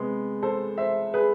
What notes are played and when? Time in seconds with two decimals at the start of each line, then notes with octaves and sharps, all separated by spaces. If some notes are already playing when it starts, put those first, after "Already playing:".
Already playing: C3 G#3 B3
0.42 A4 C5
0.78 C5 E5
1.14 G#4 B4